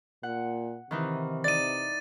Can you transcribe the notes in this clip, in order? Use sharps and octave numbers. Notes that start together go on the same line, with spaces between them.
A#2 F#5
C3 D#3 E3 D#4
D#4 D5 A6 D#7